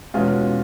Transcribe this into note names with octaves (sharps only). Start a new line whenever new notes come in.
E2 B2 G#3 C#4 F4